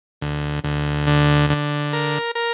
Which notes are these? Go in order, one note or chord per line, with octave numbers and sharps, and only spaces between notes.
D2
D2
D3
D3
A#4
A#4